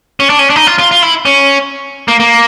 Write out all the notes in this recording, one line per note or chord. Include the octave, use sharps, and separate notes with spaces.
C#4
D4
C#4
D4
D#4
F4
F4
F4
E4
C#4
A#3
A#3